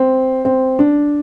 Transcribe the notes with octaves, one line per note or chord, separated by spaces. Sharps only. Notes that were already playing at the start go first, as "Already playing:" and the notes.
Already playing: C4
C4
D4